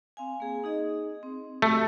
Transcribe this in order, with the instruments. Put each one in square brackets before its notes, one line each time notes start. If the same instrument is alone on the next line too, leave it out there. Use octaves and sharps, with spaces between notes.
[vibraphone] C4 F5 G#5
A#3 G#4
D#4 G#4 D#5
C4
[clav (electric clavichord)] A3 [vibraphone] F#4 G4 A4